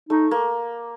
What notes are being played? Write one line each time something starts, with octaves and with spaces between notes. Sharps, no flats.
A3 D#4
A#3